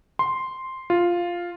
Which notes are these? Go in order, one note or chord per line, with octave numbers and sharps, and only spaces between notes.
C6
F4